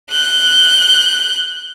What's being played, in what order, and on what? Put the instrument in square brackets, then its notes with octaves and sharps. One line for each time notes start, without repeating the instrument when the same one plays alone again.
[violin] F#6 G6